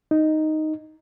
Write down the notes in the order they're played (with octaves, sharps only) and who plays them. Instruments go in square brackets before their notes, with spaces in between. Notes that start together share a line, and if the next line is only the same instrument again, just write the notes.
[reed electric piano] D#4